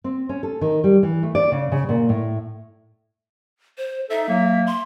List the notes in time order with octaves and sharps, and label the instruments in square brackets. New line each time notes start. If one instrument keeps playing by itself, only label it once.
[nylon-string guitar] C4
C#4
A4
D#3
G3
E3
A3
D5
C#3
C#3
A#2
A2
[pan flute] C5
[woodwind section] D#4 A4 [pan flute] E5
[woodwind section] F#3 A#3
[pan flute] C6